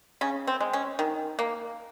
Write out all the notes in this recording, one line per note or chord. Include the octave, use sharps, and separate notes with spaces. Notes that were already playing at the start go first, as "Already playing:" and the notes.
C#3 C#4
C4
G#3
C#4
D#3
A#3